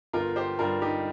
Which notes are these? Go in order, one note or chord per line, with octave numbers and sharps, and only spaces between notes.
G1 F4 A#4
G4 C5
G2 G3 F4 A#4
D#4 G4